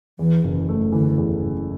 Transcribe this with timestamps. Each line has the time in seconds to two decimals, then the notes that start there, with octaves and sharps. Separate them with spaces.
0.19 E2 E3
0.44 F#1
0.69 A3
0.92 D3 E3
1.18 E2
1.43 F#1